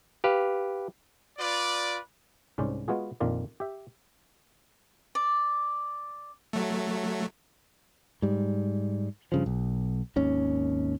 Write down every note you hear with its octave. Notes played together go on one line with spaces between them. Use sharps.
G4 B4 F5
F4 B4 D5
C2 G#2 C#4 C5 D5
G#3 B3 F4 F#4 G#4
A#1 F2 D#3 F4 D5
G4 E5
D5
F#3 A3
G#2 G3
G2 C#3 F3
B1
G#1 D#2 C#4